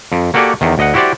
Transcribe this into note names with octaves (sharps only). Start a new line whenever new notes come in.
F2
A#3 F#4 G4 A4 D5 G#5
E2 D#3
D2 D#5 F#5
E4 F#4 G4 C5 D5